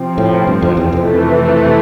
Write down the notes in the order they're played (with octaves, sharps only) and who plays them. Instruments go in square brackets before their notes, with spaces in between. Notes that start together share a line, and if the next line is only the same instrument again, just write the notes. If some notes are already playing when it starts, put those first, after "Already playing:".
Already playing: [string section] C3 F3 C4
[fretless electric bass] A2
G2
F2
E2
F2
[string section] C3 E3 A3